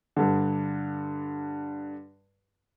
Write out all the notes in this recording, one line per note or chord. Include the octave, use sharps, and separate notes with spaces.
G2 D3